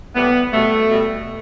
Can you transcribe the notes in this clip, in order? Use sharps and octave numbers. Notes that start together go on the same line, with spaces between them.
A2 E3 G3 B3
B2 G3 A3
B2 G3